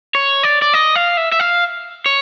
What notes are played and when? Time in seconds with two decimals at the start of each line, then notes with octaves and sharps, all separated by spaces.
0.15 C#5
0.43 D5
0.62 D5
0.74 D#5
0.96 F5
1.17 E5
1.32 E5
1.40 F5
2.06 C#5